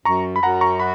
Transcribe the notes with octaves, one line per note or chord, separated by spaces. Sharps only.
F#2 A#5 C#6
B5
F#2 F#5 A#5
A#5 C#6
F#4 B5